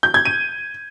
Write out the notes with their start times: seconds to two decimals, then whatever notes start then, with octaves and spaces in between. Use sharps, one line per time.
0.03 G6
0.14 G#6
0.25 D#7